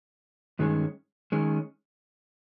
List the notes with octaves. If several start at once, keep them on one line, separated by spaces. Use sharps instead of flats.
G2 D#3 G#3 C#4
D#3 G#3 C#4